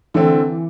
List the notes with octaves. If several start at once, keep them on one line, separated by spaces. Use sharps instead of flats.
D3 E3 A3 C4